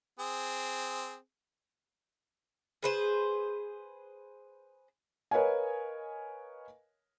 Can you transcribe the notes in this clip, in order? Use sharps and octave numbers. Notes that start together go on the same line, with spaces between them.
C4 G#4
G#4 B4 C5
A#4 B4 C#5 D#5 F5 G#5